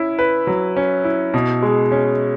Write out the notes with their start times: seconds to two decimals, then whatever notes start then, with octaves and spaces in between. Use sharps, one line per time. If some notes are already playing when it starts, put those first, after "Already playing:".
Already playing: C#4 E4
0.19 B4
0.47 F#3
0.76 C#4
1.04 E4
1.34 B2
1.63 G#3
1.92 C#4